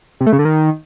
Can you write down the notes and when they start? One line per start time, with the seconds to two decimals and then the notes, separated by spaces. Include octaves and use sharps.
0.20 C3
0.26 A3
0.33 C#3
0.39 D3
0.45 D#3